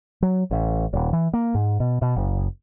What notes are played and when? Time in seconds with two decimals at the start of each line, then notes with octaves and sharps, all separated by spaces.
0.22 F#3
0.51 A1
0.93 D#1
1.13 E3
1.33 A#3
1.55 G#2
1.80 B2
2.02 B2
2.16 F#1